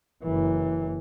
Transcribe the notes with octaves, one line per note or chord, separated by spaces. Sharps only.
F#1 E3